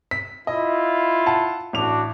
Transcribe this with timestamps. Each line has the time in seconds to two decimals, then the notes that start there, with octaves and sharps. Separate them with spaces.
0.11 B6
0.47 E4 F4 D#5
1.26 F#5 A5
1.73 A1 D4 F#4 F7